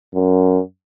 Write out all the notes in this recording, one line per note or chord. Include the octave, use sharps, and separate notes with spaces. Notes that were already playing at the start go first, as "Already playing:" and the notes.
F#2